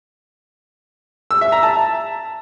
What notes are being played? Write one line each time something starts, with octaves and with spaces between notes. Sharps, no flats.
E6
E5
A#5
A5